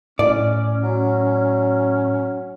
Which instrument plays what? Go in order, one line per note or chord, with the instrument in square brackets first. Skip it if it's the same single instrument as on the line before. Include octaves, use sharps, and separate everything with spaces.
[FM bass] A2 [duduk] C#4 [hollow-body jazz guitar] D5
[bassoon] F#3